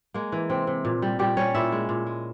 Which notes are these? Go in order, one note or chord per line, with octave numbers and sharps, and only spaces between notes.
G#3 A#3
E3
C3 C4
C3
A#2
G3
A#2 G3 G4
G3 C#4 C#5
A#2 E4 E5
G#3
A#2
G#3